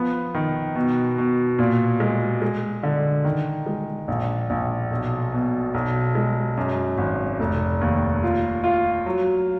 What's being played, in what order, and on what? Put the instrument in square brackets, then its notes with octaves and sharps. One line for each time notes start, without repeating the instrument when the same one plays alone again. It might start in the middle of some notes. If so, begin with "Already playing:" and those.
Already playing: [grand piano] F3 B3
D#3
B2
B2
A#2
G#3
G#3
D3
D#3
G#3
A#1
A#1
B1
B2
B1
G#3
F#2
G#1
F1
D#2
F4
F4
F#3